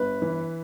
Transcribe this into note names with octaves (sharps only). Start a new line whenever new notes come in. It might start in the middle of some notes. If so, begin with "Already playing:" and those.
Already playing: G1 B4
E3